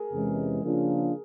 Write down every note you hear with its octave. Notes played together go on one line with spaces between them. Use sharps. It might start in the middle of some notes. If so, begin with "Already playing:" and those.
Already playing: G#4 A#4
E2 C3 E3 G#3 C#4
C#3 F3 A#3 D4 F4